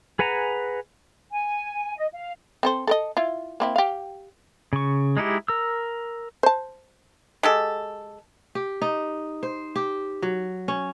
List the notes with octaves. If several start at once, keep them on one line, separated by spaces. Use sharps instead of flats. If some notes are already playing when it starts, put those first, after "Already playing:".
G#4 B4 F#5 G#5 A#5
G#5
D#5
F5
C4 A4 C5
A4 A#4 D#5
E4 F4
A#3 C4 E4
G4 F5
C#3 C#6
G#3 D#4 E4 G4
A#4 E6
C5 A5
G#3 G4 A4
G4
D#4
C5
G4
F#3
C#4